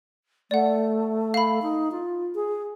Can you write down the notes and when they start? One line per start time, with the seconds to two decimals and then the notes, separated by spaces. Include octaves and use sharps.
0.51 A3 D5 F#5
1.34 F5 B5
1.62 D#4
1.92 F4
2.35 G#4